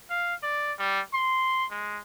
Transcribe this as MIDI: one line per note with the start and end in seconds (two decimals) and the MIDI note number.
0.10 0.34 77
0.43 0.73 74
0.78 1.00 55
1.13 1.66 84
1.71 2.00 56